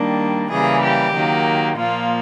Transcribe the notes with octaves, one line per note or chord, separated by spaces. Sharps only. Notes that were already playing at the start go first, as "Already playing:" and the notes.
Already playing: D#3 G3 A#3 D4
C#3 E3 G3 A#3 G#4
G4
D#3 F#3 A#3
A#2 F3 A#3 F4